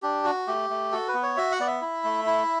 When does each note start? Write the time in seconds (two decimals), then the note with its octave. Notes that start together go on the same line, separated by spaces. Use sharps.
0.02 D4 G4
0.25 F#4
0.47 A3 G4
0.70 A3
0.92 F#4 A4
1.08 B4
1.14 B3
1.23 C#5
1.37 F#4 E5
1.52 F#5
1.60 B3 D5
1.67 E5
1.82 E4
2.04 A3
2.26 E4